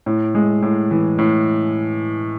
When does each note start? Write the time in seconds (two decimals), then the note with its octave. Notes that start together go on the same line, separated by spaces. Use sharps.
0.06 A2
0.35 G#3
0.62 A2
0.91 E3
1.19 A2